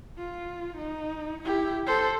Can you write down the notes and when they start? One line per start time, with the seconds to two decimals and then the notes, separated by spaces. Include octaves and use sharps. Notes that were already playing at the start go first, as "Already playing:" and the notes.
0.18 F4
0.77 D#4
1.42 E4 G4
1.87 A4 C5